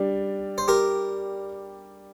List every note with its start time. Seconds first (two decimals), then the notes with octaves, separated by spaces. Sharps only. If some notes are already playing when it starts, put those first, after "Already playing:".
Already playing: G3 D4
0.58 C5
0.68 G4 A#4